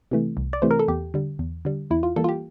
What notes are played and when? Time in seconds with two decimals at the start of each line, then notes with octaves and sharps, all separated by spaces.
0.11 C3 E3 A3
0.37 C2
0.53 D5
0.62 C3 E3 A3 C5
0.71 A#4
0.79 A4
0.88 E2 G4
1.14 D3 G3
1.39 E2
1.65 D3 G3
1.91 E2 E4
2.03 F4
2.16 E3 G3 A#3 A4
2.24 F4
2.29 G4